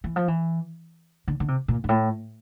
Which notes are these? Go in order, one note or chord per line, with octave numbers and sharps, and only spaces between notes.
E3
F3
E3
D3
D3
C3
A#2
G2
A2